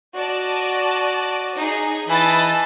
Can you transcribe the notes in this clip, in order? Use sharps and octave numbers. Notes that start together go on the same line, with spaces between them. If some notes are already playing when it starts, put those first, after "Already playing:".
F#4 D5 D#5 A5
D#4 G#4
E3 D#5 A5 B5 A6